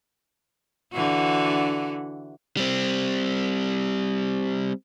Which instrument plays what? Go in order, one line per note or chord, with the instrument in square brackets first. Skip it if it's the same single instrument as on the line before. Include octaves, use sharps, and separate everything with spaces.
[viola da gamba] D3 E3 F#4
[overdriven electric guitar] G3 C4